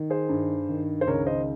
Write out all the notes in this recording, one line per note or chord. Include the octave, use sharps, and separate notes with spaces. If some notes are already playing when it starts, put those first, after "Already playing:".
Already playing: D#3
G#4 C5
G2
D#3
C5
C#2 A#4 C#5
C5 D#5